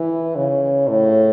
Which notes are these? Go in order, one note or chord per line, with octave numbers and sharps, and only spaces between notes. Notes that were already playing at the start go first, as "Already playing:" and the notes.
Already playing: E3
C#3
A2